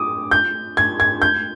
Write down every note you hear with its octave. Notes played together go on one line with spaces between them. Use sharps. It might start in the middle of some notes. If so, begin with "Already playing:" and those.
Already playing: D6 D#6
G6
G#6
G#6
G6